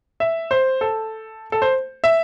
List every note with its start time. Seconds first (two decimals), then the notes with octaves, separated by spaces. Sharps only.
0.20 E5
0.51 C5
0.81 A4
1.52 A4
1.62 C5
2.04 E5